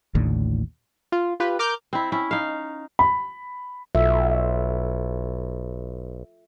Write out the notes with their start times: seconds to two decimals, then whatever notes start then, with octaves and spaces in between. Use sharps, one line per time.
0.15 A1 D#2 A2 D3
1.12 F4
1.40 F4 G4 B4
1.59 A#4 D6 F6 G6
1.93 C4 E4
2.12 C#4 E4
2.31 D#4 F5
2.99 B5
3.95 B1 F4 A4 E5